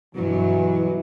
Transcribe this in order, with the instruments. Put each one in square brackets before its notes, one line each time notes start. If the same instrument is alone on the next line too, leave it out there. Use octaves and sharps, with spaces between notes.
[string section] G2 F#3 [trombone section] B2 E3